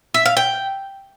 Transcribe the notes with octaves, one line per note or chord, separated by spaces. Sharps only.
E5
F5
G5